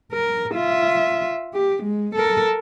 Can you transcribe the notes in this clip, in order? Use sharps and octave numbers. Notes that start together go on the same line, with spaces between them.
A#4
F4 E5
G4
G#3
A4 A#4